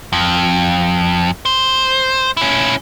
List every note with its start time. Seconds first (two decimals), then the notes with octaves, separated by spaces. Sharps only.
0.13 F2
1.45 C5
2.37 C#4 E4